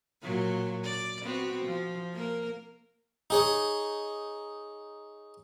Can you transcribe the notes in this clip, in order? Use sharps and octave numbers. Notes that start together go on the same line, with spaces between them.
A#2 F#3 F#4
D5
B3 C4 F#4
F3
A#3 A#4
D#4 G#4 C#5